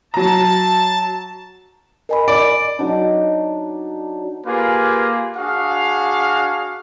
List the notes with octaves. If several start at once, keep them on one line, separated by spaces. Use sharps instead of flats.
F#3 A5 A#5
A#4 D#5 G#5 B5
D5 D7
F#3 D4 D#4
A#3 F4 G4 G#4 B4
D4 F#4 G#4 F5